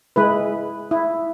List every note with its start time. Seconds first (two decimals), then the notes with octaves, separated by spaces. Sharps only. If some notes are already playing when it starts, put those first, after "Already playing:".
0.16 G#3 E4 B4
0.91 E4